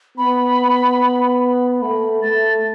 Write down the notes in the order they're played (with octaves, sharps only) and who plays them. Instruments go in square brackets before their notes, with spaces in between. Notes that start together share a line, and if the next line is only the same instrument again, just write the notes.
[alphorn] B3 [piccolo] B5
[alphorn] A3 [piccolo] B5
[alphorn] A3 [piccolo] A6